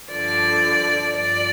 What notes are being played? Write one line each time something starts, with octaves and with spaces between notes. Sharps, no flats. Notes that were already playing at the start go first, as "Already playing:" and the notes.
G2 D3 F3 D5
G2 F3 D5